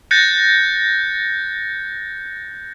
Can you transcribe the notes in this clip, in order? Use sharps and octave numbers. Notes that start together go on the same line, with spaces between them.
F#6 G6 A6 A#6 C#7